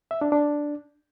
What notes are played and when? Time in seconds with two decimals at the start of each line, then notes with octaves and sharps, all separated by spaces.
0.11 E5
0.21 D4
0.32 D4